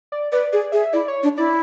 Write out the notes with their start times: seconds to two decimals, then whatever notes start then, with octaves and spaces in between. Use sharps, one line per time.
0.12 D5
0.32 B4 D5
0.52 G#4 D5
0.72 G#4 E5
0.93 E4 D5
1.08 C#5
1.23 D4
1.38 E4 D5